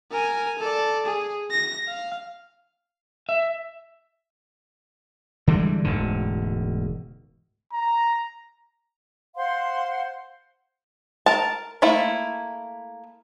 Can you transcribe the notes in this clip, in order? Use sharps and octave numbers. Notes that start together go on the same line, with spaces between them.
A#4 G#5
A4 D5
G#4
A#6
F5
E5
D3 E3 G3 G#3
E1 D2 G#2 D3
A#5
C5 F5 F#5 C6
A#4 A5
A3 A#3 E4